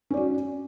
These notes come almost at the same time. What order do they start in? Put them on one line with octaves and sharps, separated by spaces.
C#4 D5 F#4